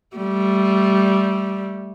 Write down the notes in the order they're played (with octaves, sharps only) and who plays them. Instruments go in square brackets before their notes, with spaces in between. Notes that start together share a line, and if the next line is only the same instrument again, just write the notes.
[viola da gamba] G3 A3